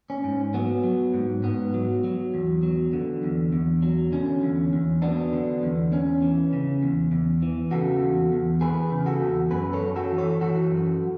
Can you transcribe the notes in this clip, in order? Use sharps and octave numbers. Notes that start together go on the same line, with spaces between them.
C#4
G#2
F#3 B3
F#3
G#2
G#2 B3
F#3
F#3
E2
F#3
D3
E2
E2
F#3
D3 C#4
E2
E2
F#3 B3 D4
D3
E2
E2 C#4
E3
C#3
E2
E2
E3
C#3 F#4 A4
E2
E2
E3 G#4 B4
C#3
F#4 A4
E2
F#2 G#4 B4
A4 C#5
F#2
F#4 A4
E3
A4 C#5
E3 F#4 A4
F#2